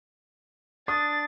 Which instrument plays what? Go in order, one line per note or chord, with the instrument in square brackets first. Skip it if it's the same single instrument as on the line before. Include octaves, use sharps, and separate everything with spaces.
[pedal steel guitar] D4 [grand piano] D#6 [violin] A6